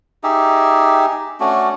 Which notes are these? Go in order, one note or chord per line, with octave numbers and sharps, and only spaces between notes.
D#4 G4 G#4 E5
A3 C#4 D4 F#4